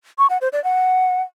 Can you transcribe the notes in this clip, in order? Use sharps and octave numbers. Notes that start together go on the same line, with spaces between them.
C#6
F#5
C5
D5
F#5